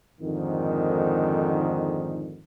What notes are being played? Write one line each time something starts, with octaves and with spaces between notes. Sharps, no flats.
F2 G#2 D3 D#3